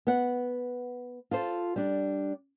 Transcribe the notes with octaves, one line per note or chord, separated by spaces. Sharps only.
B3 F#5
F4 A4 C5
G3 D4